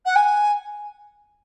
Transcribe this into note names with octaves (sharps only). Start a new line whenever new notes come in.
F#5
G#5